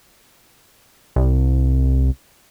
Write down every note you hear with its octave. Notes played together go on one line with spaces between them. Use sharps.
C2